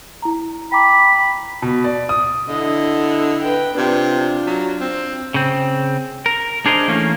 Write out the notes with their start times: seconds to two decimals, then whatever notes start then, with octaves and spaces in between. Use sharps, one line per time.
0.22 E4 A#5
0.72 G5 A#5 B5 D6
1.62 B2
1.84 D5
2.09 D#6
2.49 D3 E4 D#5
3.42 B4 G5
3.78 C3 D4 F4
4.47 F#3
4.81 C4
5.34 C#3 C4
6.26 A#4
6.66 D4 G#4 A#4 C5 D#5
6.88 E3 A3 A#3 C#4